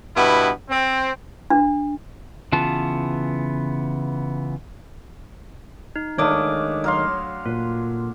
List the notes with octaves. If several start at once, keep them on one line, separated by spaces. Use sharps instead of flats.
G2 B2 B3 E4
C4
D4
C#3 E3 B3 F4 A5
D#4
D#3 G#3 A3 D4 C#5 F5 D6 D#6
F#3 F5 C6
A#2 F4